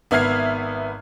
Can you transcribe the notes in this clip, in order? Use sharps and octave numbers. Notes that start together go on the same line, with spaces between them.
G#1 B3 E5 F6 G#6 C7